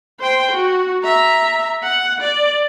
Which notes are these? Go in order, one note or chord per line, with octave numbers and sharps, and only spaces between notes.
C5 G5
F#4
E5 A#5
F#5
D5